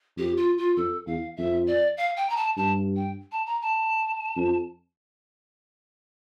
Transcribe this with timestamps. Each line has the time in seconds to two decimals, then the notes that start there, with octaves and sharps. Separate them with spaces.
0.17 F2 G4
0.37 F4
0.58 F4
0.77 F2 A4
1.07 E2 F5
1.37 F2 E5
1.67 D5
1.97 F5
2.17 G5
2.29 A#5
2.37 A5
2.57 G2 A5
2.96 G5
3.32 A5
3.46 A#5
3.62 A5
4.36 F2